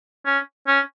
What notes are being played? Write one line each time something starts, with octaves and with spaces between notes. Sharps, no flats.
C#4
C#4